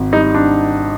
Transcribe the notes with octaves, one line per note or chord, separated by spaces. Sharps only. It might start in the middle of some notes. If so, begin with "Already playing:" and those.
Already playing: G#1
G3 D#4
D4